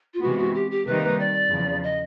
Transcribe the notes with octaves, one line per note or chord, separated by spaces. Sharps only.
F4
C3 E3 G#3 B3 F#4
F#4
G4
G4
C3 D#3 G3 A#3 D#4 B4
B4
D5
E2 C#3 F3
D#5